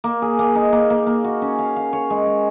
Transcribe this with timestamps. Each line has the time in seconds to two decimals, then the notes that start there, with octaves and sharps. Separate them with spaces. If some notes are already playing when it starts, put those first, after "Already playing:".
0.04 A#3
0.22 G#4
0.39 A#3
0.55 D#4
0.72 A#3
0.90 A#3
1.07 A#3
1.24 F#4
1.42 C#4
1.59 F5
1.76 F5
1.93 C#5
2.10 G#3
2.27 G#3